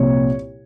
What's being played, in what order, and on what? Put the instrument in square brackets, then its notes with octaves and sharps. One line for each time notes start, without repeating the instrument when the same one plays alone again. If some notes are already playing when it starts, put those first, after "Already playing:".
Already playing: [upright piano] C2 A#2 F3 C#5